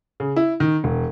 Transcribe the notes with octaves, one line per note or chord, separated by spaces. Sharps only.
C#3
E4
D#3
E1